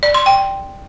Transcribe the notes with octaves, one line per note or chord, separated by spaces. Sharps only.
D5
C6
G5